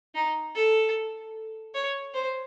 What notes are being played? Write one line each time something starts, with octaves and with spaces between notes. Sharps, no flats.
D#4
A4
C#5
C5